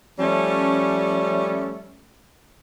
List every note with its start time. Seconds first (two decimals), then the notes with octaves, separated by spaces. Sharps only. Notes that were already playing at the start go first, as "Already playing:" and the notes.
0.19 F3 G3 A3 C#4